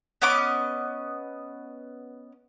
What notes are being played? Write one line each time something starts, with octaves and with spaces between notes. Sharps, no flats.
B3 C#4 D#5 D6